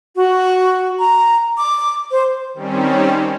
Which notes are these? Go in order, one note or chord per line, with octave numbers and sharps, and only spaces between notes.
F#4
A#5
D6
C5
D#3 G3 C4 C#4